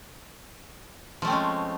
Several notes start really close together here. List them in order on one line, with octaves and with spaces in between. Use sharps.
F3 A3 C4 C#4 G#3